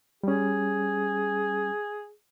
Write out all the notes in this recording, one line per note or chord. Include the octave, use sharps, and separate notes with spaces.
G3 C#4 G#4